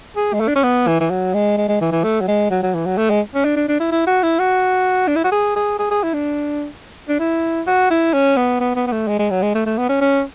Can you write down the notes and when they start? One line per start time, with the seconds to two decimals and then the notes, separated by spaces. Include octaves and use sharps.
0.16 G#4
0.33 G#3
0.40 A3
0.48 D4
0.56 C#4
0.63 B3
0.87 E3
1.00 E3
1.10 F#3
1.34 G#3
1.58 G#3
1.68 G#3
1.81 E3
1.92 E3
2.04 A3
2.21 F#3
2.28 G#3
2.51 F#3
2.63 F#3
2.75 E3
2.86 F#3
2.98 A3
3.10 G#3
3.35 C#4
3.45 D4
3.56 D4
3.68 D4
3.80 E4
3.92 E4
4.07 F#4
4.23 E4
4.39 F#4
5.07 D4
5.16 E4
5.24 F#4
5.32 G#4
5.56 G#4
5.79 G#4
5.91 G#4
6.03 E4
6.14 D4
7.09 D4
7.20 E4
7.67 F#4
7.90 E4
8.13 C#4
8.37 B3
8.60 B3
8.76 B3
8.87 B3
8.92 A3
9.07 G#3
9.19 G#3
9.30 F#3
9.43 G#3
9.55 A3
9.66 A3
9.77 B3
9.89 C#4
10.01 C#4